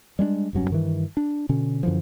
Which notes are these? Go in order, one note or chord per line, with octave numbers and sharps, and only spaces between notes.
G3 G#3 C4 D4
F1 G2 F#3 C#4
G2 D#3 E3
D4
B2 D3 C#4
F#2 D3 E3 F3